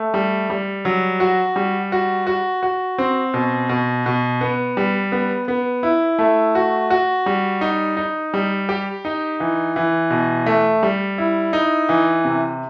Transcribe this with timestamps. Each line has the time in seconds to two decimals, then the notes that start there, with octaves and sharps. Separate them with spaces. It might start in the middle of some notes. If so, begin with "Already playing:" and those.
Already playing: A3
0.14 G3
0.50 G3
0.85 F#3
1.20 F#4
1.56 G3
1.92 F#4
2.27 F#4
2.63 F#4
2.98 C4
3.34 B2
3.69 B2
4.06 B2
4.41 B3
4.77 G3
5.12 B3
5.48 B3
5.83 E4
6.19 A3
6.55 F#4
6.90 F#4
7.26 G3
7.61 D#4
7.97 D#4
8.34 G3
8.69 G4
9.05 D#4
9.40 E3
9.76 E3
10.10 B2
10.46 A3
10.83 G3
11.18 E4
11.53 D#4
11.89 E3
12.25 C3